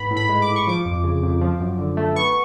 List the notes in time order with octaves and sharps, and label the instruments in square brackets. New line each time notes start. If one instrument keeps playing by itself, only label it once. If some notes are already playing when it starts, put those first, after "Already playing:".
Already playing: [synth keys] G#2 B3 B5
A2
B5
G#3
D6
A2
C#6
F3 D6
F2
C#3
F2
F3
F#2
D3
A3
B3 C#6